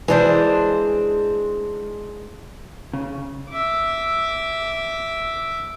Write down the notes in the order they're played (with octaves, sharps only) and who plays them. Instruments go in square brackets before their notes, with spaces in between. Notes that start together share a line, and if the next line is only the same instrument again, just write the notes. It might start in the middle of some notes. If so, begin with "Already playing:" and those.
[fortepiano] E3 [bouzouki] G#3 D4 C5
[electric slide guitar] C#3
[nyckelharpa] E5 D6